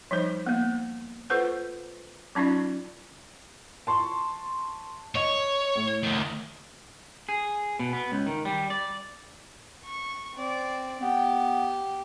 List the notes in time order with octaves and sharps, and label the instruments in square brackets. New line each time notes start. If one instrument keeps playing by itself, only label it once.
[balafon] F3 G3 D#4 C5
A#3 B3
F4 A4 B4 C5 F#5
F#3 C#4 D#4 F4 D5
[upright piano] A5 C6 C#6
[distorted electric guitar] C#5 [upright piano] D#5
[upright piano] A2
[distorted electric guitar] D2 D#3
[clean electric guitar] G#4
B2
B3
C#2
D#3
G3
D5
[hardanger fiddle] C#6
C4 D5
[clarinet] B3 [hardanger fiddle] G4